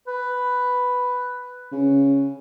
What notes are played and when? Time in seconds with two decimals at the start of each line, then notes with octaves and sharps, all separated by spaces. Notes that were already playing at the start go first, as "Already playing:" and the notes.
0.07 B4
1.72 C#3